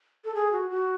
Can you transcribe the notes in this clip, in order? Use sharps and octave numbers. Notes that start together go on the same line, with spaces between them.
A4
G#4
F#4
F#4